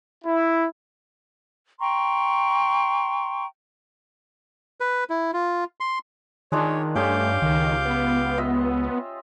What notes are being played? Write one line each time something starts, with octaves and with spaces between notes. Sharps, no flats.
E4
G5 A#5 C6 C#6
B4
E4
F4
C6
D#3 G#3 D4 F4 C#5
G2 A3 C#4 G4 D#5 F5 D6 G6
C#2 D#3
B3
F4 D#5 E5